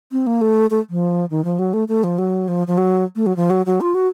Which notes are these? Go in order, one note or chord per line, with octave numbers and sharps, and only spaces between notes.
C4
A#3
A3
A3
F3
D#3
F3
F#3
A3
A3
F3
F#3
F3
F3
F#3
A3
F#3
F3
F#3
F#3
F4
F#4